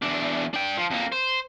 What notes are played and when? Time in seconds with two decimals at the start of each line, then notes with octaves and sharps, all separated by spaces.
0.03 E2 D4
0.54 D4 G5
0.77 F3
0.90 F2 A#3
1.12 C5